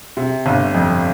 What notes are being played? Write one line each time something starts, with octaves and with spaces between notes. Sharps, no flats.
C3
G1
F2